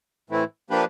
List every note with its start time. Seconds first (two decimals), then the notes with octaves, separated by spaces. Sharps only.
0.30 A2 E3 A3 C4 E4
0.70 F3 A#3 D4 G4 B4